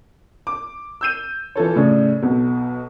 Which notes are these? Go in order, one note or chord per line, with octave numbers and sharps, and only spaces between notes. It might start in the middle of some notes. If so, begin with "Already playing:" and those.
D6
E6 G6 D#7
E3 F4 A4 C#5
A2 C#3 C#4 D4
B1 B2